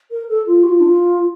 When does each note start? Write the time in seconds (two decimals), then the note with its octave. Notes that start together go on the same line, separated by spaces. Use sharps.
0.10 A#4
0.28 A4
0.46 F4
0.63 G4
0.68 F4
0.80 D4
0.85 F4